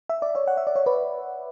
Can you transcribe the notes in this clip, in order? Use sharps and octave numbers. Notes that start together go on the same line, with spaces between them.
E5
D5
C#5 E5
F#5
E5
D5
C#5 E5
B4 D5